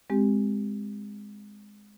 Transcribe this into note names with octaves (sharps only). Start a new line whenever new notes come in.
G#3 C4 G4